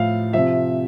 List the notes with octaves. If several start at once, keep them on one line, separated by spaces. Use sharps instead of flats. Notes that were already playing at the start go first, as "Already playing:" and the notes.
Already playing: A2 F3 F5
C3 F3 E5